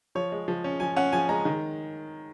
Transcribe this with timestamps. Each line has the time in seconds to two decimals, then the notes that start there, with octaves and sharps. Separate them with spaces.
0.15 F3 C#5
0.32 G#3
0.48 F3
0.64 C#4
0.80 F3 G#5
0.96 C#4 F#5
1.12 F3 G#5
1.29 G#3 A#5
1.45 D#3